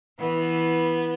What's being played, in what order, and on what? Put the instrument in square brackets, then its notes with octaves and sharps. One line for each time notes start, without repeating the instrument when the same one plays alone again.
[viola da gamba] E3 [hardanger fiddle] B3